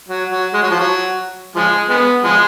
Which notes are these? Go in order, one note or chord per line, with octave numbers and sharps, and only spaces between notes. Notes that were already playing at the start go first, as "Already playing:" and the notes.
F#3
F#3
G#3
F#3
F3
F#3
F3 G#3
G#3 B3
F3 G#3